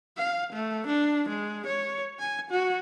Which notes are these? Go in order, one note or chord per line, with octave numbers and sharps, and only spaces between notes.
F5
A3
D4
G#3
C#5
G#5
F#4